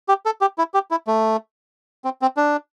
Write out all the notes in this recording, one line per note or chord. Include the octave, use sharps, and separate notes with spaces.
G4
A4
G4
E4
G4
E4
A3
C4
C4
D4